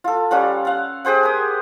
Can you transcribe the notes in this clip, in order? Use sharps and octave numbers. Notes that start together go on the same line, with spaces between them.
F4 A4
G3 C#4 F4 F#5
F5 F#5
G4 G#4 C5 F#5
A#4 D#6